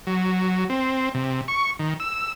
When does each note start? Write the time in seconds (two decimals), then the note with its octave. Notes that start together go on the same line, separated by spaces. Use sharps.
0.07 F#3
0.69 C4
1.15 C3
1.48 C#6
1.79 D#3
2.00 E6